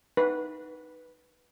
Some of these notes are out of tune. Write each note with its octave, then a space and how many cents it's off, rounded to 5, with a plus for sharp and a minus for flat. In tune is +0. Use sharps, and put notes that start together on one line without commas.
D#4 +0 B4 -5